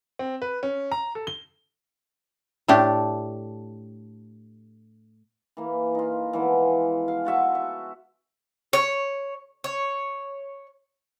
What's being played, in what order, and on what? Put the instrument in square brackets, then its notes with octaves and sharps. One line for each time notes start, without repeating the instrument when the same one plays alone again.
[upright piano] C4
B4
C#4
A#5
A4
G7
[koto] A2 A3 D4 G4
[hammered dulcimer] E3 A#3
D#4 F4
E3 F3 G#3 B3
F5
F4 F#4 E5 A5
E5
[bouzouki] C#5
C#5